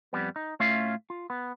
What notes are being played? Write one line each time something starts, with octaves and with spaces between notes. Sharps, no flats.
F2 G3 B3
D#4
A2 A3 C#4 F4 E5 F5
F4
B3